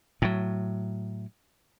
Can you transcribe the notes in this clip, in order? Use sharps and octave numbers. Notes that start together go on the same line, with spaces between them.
A2 F#3